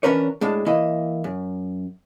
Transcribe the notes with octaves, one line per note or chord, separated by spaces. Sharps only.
E3 C#4 D4 A#4 B4 C#5
A2 G#3 D4
E3 A#3 E4 D#5
F#2